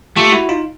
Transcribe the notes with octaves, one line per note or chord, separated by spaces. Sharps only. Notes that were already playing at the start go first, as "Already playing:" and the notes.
A3 F4 G4
E4 F#4
D#4 F4